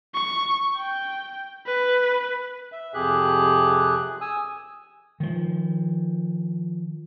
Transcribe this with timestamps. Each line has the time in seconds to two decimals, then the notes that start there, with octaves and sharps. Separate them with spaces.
0.15 C#6
0.77 G5
1.66 B4
2.72 E5
2.94 F2 C3 G4 G#4 F#6
4.21 G#5 D#6 E6
5.20 D#3 F3